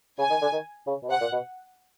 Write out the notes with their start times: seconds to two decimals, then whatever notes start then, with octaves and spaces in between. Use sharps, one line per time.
0.19 C#3 G#5
0.30 D#3
0.42 D3
0.53 D#3
0.87 C#3
1.03 B2
1.09 C3 F#5
1.21 A#2
1.33 B2